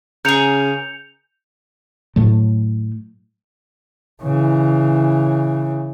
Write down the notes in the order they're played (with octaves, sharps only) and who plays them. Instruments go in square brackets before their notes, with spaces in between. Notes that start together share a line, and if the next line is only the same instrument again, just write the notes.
[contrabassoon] C#3 [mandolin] G#4 A#4 [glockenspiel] G6 C#7 F7
[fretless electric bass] A2 F#3 A3
[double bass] C#3 E3